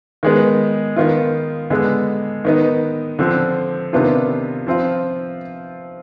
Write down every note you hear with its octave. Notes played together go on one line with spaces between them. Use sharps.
D#3 G#3 B3
D#3 B3 F4
D3 G#3 B3
D#3 B3 D#4
D3 F3 C4
C3 D#3 B3 D4 F4
F3 C4 F4